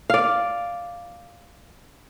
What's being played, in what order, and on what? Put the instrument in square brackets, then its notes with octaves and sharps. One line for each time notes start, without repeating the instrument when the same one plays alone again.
[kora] D5 F5